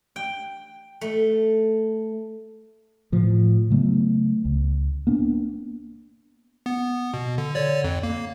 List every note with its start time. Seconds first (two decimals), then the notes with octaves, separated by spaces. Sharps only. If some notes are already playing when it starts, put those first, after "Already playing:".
0.16 G5
1.01 A3
3.12 A2 F3
3.70 C#3 F#3 A3 B3
4.45 C#2
5.07 A#3 B3 D4
6.66 B3
7.14 B2
7.38 D3
7.55 D3 C#5 D5
7.84 F2
8.03 A#3